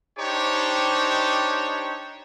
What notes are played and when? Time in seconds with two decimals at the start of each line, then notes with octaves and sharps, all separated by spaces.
0.19 D4 D#4 G4 C5 C#5